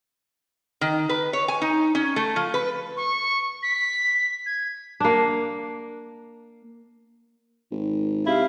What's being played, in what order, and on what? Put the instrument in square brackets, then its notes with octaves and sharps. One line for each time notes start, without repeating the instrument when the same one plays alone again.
[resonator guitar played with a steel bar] D#3
B4
C#5
G#5
D#4
C#4
A3
F3
B4
[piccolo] C#6
B6
G#6
[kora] A#3 D4
[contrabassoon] G#1
[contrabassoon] C3 [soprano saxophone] E4 [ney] F5